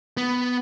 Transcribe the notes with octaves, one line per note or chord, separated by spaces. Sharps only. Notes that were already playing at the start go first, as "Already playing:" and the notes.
B3